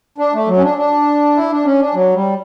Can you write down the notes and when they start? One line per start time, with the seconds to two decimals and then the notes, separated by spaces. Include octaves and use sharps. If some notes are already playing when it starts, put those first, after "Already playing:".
0.18 D4
0.34 A3
0.47 F#3
0.57 C#4
0.63 D4
0.77 D4
1.36 E4
1.50 D4
1.65 C#4
1.79 D4
1.94 F#3
2.14 G3